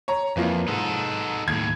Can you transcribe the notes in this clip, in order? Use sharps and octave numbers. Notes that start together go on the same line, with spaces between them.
C#5 A#5
F2 E3 F3 A#3
G#2 D#4 A4
D#2 A2 G#6